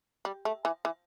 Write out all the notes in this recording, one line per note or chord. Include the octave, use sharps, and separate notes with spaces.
G3
A3
E3
E3